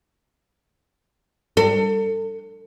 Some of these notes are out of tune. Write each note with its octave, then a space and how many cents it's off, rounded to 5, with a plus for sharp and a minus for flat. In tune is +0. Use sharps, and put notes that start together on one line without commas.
A4 +30